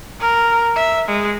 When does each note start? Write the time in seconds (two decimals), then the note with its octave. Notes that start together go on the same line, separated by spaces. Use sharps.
0.20 A#4
0.76 E5
1.08 G#3